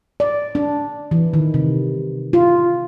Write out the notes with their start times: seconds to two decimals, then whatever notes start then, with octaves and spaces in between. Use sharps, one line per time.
0.20 D5
0.55 D4
1.11 E3
1.34 D#3
1.54 C3
2.33 F4